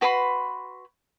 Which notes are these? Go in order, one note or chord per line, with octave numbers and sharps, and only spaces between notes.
F#4 B4 B5 C6